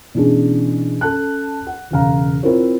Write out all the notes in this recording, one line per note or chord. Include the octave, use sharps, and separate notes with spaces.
B2 E3 C#4 D4 G#4
C#4 A4 A5 F#6
F#5
E1 C#3 F5 A#5
C4 E4 F4 A#4 C5 C#5